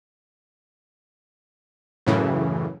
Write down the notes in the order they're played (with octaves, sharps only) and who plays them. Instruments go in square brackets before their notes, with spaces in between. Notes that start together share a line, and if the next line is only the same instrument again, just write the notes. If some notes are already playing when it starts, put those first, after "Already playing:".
[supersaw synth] F#2 A2 C#3 E3